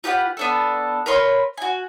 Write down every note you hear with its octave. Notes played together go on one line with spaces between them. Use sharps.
F4 G4 B4 F#5
B3 D4 A4
A#4 B4 C#5 C6
F#4 G#5